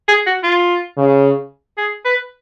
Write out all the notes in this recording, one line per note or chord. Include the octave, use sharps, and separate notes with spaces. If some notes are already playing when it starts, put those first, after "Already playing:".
G#4
F#4
F4
C#3
G#4
B4